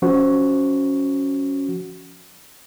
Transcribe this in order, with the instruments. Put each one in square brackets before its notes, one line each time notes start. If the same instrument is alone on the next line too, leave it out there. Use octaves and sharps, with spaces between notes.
[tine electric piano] F3 C#4 F#4